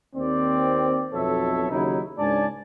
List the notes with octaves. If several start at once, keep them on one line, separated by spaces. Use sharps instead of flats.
D#2 C4 D5
B1 F2 B2 A4 C#5 E5
D#2 C#3 F#3 D#4 E4
C#2 G#2 D4 D5 G#5 A5